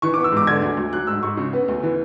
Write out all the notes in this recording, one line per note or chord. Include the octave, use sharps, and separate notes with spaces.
E3 C#6
B3 D6
E6
G#2 D6
D3 G#6
D2
D2
F#3 F#6
G#2 E6
G#2 C#6
C#3
B3
D2
E3